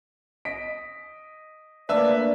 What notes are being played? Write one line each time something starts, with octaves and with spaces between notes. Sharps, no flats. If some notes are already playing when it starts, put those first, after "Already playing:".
D#5 B6 D7
A3 A#3 D4 B4 D5 E5 E6